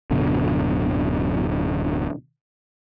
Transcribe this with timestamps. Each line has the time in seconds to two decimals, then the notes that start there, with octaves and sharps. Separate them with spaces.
0.11 D1 F#2 B2 D3